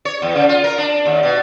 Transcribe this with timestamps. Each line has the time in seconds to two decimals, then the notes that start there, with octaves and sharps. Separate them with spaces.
0.05 C#5
0.22 E2
0.36 C#3
0.49 F4
0.64 A#4
0.78 D4
1.05 D#2
1.23 B2